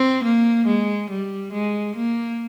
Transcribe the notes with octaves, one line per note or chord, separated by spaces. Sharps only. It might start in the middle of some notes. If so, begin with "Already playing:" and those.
Already playing: C4
A#3
G#3
G3
G#3
A#3